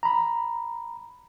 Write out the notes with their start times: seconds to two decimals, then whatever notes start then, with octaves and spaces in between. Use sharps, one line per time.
0.03 A#5 B5